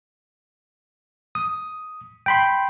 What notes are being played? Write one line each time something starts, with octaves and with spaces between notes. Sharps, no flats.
D#6
G5 B5 C6